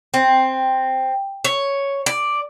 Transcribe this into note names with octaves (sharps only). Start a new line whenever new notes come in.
C4
C#5
D5